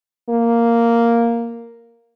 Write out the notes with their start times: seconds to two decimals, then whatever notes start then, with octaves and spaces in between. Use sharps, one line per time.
0.29 A#3